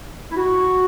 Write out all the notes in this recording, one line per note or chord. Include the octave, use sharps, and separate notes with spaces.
E4
F#4